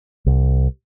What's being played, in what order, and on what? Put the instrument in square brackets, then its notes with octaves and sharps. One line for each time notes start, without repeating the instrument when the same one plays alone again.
[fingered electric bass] C2